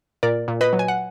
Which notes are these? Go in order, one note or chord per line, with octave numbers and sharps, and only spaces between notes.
A#2 A#4 D5
A#2
B4 D#5
F#3
G#5
F#5